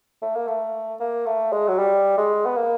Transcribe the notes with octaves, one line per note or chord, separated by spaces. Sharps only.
A3
A#3
A3
A#3
A3
G#3
F#3
G3
G#3
B3
A#3